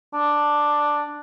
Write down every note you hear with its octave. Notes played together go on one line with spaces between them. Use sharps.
D4